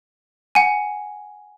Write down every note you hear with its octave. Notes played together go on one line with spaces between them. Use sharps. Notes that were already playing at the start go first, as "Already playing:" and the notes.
F#5 G#5